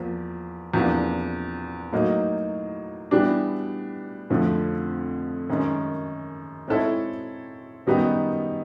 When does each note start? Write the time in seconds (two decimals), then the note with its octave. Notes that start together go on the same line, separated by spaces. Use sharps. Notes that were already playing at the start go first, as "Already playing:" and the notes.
Already playing: E2 F3 A#3
0.74 E2 C3 F3 A#3 D4
1.93 A2 F#3 A#3 D#4
3.11 E3 G3 B3 D4
4.30 F2 D3 F3 A3
5.49 F#2 D#3 G#3 C#4
6.68 G#3 C4 E4 A4 C#5
7.86 F#2 D#3 G3 B3 D#4